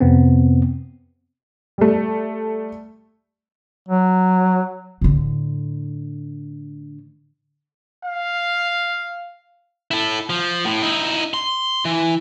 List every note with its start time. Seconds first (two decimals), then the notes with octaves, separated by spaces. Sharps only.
0.01 F2 C3 B3 C4
1.78 G3 A3
3.89 F#3
5.01 A2 D3
8.05 F5
9.91 E4 A4
10.30 F3
10.65 A2
10.82 D#4 E4
11.34 C6
11.85 E3